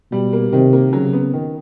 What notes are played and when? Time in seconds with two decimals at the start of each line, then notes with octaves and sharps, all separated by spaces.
0.11 B2 G3
0.33 A#3
0.52 C3 D#3
0.73 A#3
0.93 C#3 F#3
1.13 B3
1.33 D#3